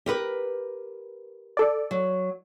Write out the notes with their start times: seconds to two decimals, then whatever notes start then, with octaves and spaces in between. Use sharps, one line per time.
0.06 G4 A#4 B4
1.57 A4 D5
1.91 F#3